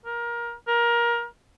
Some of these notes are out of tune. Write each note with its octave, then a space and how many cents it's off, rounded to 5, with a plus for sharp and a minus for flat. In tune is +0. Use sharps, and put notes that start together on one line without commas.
A#4 +20
A#4 +20